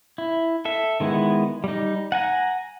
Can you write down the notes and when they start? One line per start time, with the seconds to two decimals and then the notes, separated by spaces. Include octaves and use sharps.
0.18 E4
0.65 A4 E5
1.00 D#3 G#3 B3 E4
1.64 G3 D#4
2.12 F#5 G#5 A#5